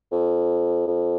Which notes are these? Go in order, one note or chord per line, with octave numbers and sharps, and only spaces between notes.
F2
F2